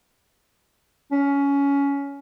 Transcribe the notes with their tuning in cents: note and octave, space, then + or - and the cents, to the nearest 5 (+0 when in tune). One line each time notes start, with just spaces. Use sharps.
C#4 +20